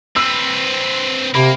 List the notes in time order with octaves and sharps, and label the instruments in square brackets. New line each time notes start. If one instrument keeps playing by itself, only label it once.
[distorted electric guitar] C4 B4 [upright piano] E6
[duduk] C3 [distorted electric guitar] A#3 [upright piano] B5